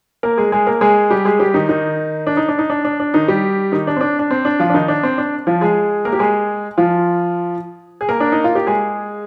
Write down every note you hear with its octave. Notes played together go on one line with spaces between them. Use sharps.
A#3 A#4
G#3 G#4
G#3 G#4
A#3 A#4
G#3 G#4
G3 G4
G#3 G#4
G3 G4
D#3 D#4
D#3 D#4
D4
D#4
D4
D#4
D4
D4
D4
D#3 D#4
G3 G4
D#3 D#4
D4
C4
D4
D4
C4
D4
F3 F4
D4
D#3 D#4
D4
C4
D4
F3 F4
G#3 G#4
A#3 A#4
G4
G#3 G#4
F3 F4
G#4
A#3 A#4
D4
D#4
F4
G4
G#3 G#4